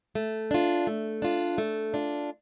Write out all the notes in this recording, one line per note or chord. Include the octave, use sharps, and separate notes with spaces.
A3
D4 F4
A3
D4 F4
A3
D4 F4